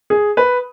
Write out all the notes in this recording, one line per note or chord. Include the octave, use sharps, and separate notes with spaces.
G#4
B4